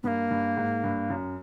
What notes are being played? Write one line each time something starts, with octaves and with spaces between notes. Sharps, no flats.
G2 A#3 B3
G2
G#2
G2
F#2